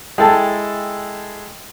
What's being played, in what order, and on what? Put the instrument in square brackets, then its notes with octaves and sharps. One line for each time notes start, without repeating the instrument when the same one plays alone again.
[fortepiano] G#3 E4 A4 [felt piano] G5 A5